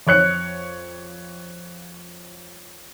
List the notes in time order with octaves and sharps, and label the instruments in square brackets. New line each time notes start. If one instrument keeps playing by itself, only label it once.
[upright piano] F2 C#5 F#6 C#7